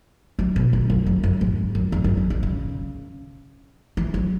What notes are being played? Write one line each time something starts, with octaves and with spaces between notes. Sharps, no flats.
F#3
B2
F#2
F#2
F#2
F#2
G#2
F#2
E2
F#2
G#2
C#3
C#3
E3
F#3